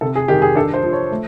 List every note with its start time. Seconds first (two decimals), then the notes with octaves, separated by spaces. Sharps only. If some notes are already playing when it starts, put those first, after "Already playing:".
0.01 C3 A4
0.15 G#4
0.28 D#3 G4
0.42 G#4
0.55 D4 A4
0.74 C5
0.83 F3
0.93 C#5
1.11 A3